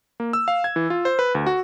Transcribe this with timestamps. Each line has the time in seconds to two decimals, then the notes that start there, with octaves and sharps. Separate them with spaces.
0.20 A#3
0.33 E6
0.48 F5
0.64 G#6
0.76 E3
0.90 F4
1.05 C5
1.19 B4
1.35 D2
1.47 F#4